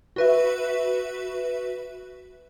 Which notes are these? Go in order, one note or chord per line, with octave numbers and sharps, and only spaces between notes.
F#4 B4 E5